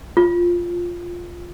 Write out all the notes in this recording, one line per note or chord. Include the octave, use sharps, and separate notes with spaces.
F4